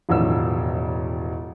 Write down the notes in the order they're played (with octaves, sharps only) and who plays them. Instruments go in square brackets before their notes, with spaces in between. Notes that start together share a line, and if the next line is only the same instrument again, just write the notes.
[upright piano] E1 A1 D#3 F3 E6